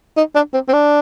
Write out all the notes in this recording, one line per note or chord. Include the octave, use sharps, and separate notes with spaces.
D#4
D4
C4
C4
D4